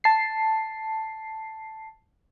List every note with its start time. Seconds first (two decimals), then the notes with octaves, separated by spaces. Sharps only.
0.04 A5 C7